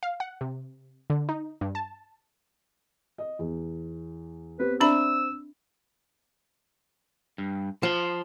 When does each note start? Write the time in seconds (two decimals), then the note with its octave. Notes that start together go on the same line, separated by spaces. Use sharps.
0.03 F5
0.20 F#5
0.41 C3
1.10 D3
1.29 D#4
1.61 G2
1.75 A5
3.18 D#5
3.39 E2
4.59 B3 C4 G4 B4
4.81 C4 D4 D5 E5 B5 E6
7.38 G2
7.83 F3 A5 C6